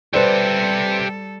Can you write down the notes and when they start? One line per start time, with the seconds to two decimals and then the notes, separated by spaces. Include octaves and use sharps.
0.13 G3 G4 A4 B4 C5 D5 E5